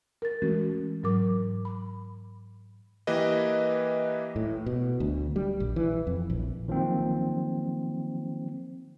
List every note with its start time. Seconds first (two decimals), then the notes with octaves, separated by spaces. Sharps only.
0.22 A#4 A6
0.42 E3 G#3 A3 C#4 F#4
1.03 G#2 F#3 A#4 D6
1.65 B5
3.07 E3 A#3 G4 B4 D#5
4.36 A2
4.66 B2
5.00 D2
5.36 G3
5.60 A#1
5.76 E3
6.07 F2
6.30 A#1
6.68 D#3 F3 F#3 A#3 C4